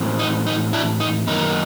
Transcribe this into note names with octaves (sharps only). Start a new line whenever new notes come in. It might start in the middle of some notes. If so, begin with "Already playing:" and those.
Already playing: A2 E3 G#3 C4
D#4
D#4
D4 E4
D#4
F#2 D#3 F#3 A#3 D#4